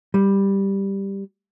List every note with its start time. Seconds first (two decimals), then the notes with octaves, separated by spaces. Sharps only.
0.14 G3